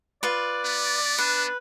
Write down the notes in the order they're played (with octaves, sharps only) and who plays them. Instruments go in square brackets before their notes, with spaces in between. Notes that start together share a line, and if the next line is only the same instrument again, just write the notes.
[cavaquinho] F4 B4 [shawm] D5
[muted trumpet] B3
[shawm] D4 [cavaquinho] B4